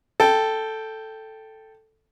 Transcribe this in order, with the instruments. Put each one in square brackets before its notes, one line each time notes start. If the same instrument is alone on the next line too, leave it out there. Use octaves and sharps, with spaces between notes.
[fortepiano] A4 G5